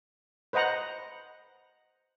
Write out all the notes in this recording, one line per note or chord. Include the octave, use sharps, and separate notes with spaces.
B4 C5 D#5 F#5 A#5